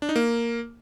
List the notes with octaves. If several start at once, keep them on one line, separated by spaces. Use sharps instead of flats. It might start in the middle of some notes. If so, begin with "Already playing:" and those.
D4
D#4
A#3